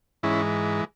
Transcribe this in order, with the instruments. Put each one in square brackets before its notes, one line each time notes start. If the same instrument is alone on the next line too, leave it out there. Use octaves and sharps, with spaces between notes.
[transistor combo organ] G#2 E3 G#3 C#4 E4